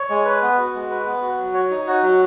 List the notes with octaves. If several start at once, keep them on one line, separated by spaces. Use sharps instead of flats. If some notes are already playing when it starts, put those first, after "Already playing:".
Already playing: C#5
G#3
B4
B3
F#4
G#3
B4
B3
F#4
F#3
C#5
D#4
F#4
F#3